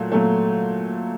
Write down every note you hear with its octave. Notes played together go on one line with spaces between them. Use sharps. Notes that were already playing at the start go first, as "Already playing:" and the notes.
Already playing: A#2 F#3 A3
A#2 F#3 A3